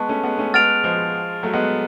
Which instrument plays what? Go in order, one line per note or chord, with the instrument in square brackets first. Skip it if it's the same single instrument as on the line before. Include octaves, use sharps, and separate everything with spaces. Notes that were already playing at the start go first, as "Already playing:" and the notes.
Already playing: [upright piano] G#3 B3 [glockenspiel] A5 C#6
[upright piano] A3 C#4
G#3 B3
A3 C#4
[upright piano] G#3 B3 [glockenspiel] F6 A6 D7 F7
[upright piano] F3 G#3
F#3 A3
G#3 B3